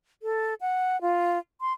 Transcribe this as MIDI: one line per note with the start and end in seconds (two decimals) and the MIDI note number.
0.22 0.54 69
0.61 1.00 78
1.01 1.38 65
1.61 1.73 84